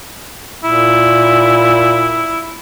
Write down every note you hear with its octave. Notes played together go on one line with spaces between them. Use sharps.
A#2 E4